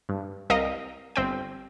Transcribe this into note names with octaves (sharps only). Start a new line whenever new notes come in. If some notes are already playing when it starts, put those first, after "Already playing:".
G2
C2 A#4 D#5 F5 D#6
G1 C4 G5